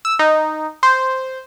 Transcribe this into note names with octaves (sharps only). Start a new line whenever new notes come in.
E6
D#4
C5